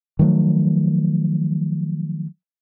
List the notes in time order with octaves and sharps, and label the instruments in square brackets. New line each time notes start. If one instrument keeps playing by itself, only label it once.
[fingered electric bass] D#3 F3 F#3 A3